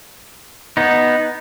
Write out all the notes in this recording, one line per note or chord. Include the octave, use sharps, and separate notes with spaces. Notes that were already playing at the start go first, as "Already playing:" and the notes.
B3 D#4